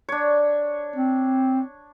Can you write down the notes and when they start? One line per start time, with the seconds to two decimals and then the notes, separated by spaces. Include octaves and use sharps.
0.09 D4 C#5
0.96 C4